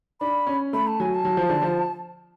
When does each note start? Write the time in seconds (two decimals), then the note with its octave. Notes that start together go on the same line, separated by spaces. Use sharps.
0.20 D4 B5
0.47 C#4
0.73 A3 B5
0.87 A5
1.00 F#3 G#5
1.14 A5
1.25 F#3
1.37 F3
1.49 D3
1.62 F3